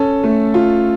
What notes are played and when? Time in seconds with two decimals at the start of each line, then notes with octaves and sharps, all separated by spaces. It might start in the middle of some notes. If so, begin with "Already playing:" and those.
Already playing: C#4 A4
0.24 A3
0.54 F4